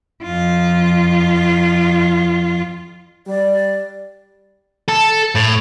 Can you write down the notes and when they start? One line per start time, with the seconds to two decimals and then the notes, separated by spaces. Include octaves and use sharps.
0.23 F2 F4
3.27 G3 D5
4.88 A4
5.35 A2